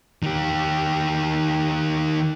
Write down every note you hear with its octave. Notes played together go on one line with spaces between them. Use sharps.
D#3 G4